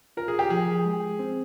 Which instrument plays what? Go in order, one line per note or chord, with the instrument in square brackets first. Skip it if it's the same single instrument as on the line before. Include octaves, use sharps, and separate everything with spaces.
[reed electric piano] F4 [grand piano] A#4
[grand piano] G#4
G4
[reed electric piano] F3 [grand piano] G#4
[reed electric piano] G#3
C4